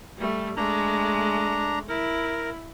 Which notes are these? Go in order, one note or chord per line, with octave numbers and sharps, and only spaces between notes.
G3 A3
G#3 A3 D4 A#5
E4 A#4